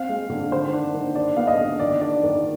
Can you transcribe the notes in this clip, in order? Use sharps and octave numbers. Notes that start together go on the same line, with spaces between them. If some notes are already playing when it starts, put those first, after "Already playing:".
Already playing: C4 F5
G#3
D3
D#3 C5
D4
D#3
D4 D5
B3 F5
D#5
D3
D#3 D5
D4 D5
D#3 D5